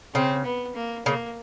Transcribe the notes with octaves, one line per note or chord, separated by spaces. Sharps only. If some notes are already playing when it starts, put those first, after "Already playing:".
C#3 C4
B3
A#3
C#3 A#3